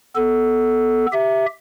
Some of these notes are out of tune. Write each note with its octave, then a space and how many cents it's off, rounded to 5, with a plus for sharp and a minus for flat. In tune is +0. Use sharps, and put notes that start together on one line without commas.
B3 +0 A4 -5
G4 +0 E5 +0